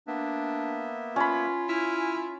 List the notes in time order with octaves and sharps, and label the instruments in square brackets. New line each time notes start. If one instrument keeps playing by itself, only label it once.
[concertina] A#3 B3 E5 [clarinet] D4
[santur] C#4 B5 [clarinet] F4
[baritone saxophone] E4 [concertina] G#5 F6